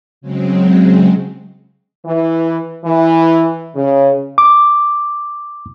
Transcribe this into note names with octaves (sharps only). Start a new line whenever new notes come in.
C#3 F#3 G#3 C4
E3
E3
C#3
D6